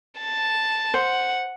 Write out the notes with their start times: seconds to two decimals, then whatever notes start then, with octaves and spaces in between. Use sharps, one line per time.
0.21 A5
0.94 C5 F#5